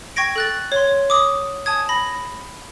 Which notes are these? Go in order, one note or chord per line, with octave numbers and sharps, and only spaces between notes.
G5 C#6 G#6 A#6 D7
A4 F#6 A6
C#5 C6
D6 D#6
G#5 A5 D#6 G#6
B5 A#6